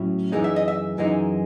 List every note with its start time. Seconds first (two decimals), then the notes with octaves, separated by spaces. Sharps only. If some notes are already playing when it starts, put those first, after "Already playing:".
Already playing: A2 F#3 C#4 E4
0.32 F#2 E3 G#3 D#4
0.44 E5
0.56 D#5
0.68 E5
0.98 F#2 E3 G#3 D#4